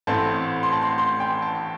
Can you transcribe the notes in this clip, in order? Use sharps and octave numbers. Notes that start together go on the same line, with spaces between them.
A1 A2 A3 C4 A5
C6
A5
C6
C6
G5
A5